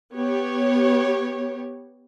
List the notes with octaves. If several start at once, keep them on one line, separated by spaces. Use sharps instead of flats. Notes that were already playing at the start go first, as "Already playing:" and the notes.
B3 G4 C#5